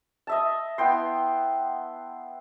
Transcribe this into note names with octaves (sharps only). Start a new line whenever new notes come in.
D#5 E5 A5
B3 E4 G5 C6